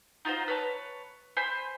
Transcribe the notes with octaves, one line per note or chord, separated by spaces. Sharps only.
D#4 F4 F#4 C5
B4 C#5 A5
C5 G#5 B5